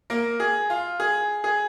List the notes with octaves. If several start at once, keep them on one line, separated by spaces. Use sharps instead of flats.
A#3 A#4
G#4
F4
G#4
G#4